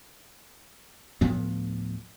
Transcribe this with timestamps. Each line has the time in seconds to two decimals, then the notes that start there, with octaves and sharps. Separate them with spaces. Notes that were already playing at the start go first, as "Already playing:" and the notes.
1.21 D2 A2 F3 B3